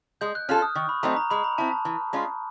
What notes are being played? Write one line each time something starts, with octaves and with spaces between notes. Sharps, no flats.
G#3 G6
F#6
C#4 F4 A4 F6
D#6
D#3 C#6
B5
F#3 A3 C4 D#4 A#5
A#5
G#3 B5
A#5
C4 E4 A5
A5
E3
G#3 C#4 F4